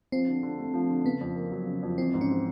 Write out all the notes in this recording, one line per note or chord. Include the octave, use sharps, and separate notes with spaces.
F3 C4
D3
D3
A3
F3
D3
C#3 B3
F2
A#3
F#3
C#3
F2
E3 C4
G#2
C#4
C4